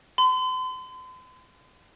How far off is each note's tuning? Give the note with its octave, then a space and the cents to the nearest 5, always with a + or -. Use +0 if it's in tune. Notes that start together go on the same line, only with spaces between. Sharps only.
C6 -40